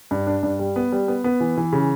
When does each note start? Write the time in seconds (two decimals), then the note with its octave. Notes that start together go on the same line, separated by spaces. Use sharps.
0.11 G2
0.27 D4
0.43 G2
0.59 G3
0.76 B3
0.92 G3
1.08 B3
1.24 B3
1.40 E3
1.57 E3
1.73 C#3